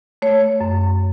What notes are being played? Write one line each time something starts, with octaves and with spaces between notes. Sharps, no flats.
A3 C#5
F#2